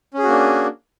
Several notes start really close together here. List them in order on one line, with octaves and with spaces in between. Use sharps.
C#4 G#4 F#4 A#3 D4